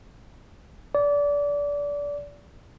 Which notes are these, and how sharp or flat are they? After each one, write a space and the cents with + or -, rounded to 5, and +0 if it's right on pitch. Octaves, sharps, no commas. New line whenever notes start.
D5 -25